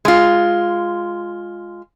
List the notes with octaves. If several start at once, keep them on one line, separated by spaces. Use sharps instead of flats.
G#3 F4